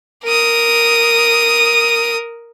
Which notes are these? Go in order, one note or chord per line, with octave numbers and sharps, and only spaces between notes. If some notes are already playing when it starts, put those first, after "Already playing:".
A#4 D#6